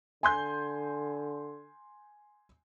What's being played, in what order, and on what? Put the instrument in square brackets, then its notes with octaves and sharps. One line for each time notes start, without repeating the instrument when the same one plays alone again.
[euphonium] D3 [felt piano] G#5 C6 G6